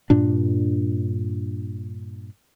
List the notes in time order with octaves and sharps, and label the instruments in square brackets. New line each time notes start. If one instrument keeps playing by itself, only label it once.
[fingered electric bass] G2 A#2 D4